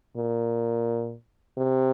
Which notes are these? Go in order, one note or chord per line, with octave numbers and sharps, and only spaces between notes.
A#2
C3